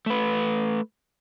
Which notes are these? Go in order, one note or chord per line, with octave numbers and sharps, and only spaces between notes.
A3 B4